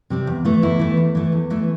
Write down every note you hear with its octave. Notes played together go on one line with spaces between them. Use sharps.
C3 G3 C4
E2
E3 A3
E2 E4
E3 A3
E2
E3 A3
E2
E3 A3